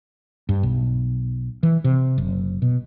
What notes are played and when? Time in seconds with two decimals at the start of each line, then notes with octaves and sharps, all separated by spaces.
0.49 G2
0.63 B1
1.63 E3
1.84 C3
2.18 F#1
2.62 B2